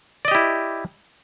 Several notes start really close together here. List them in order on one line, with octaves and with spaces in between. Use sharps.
D5 D#5 G4 E4